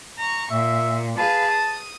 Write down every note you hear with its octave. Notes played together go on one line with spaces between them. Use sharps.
A#5 C#6
A#2 E5
G#4 B4 F5 A5
D#6